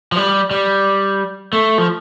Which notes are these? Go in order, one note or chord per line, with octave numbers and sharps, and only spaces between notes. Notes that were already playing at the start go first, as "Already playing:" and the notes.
F3
G3
G3
A3
F3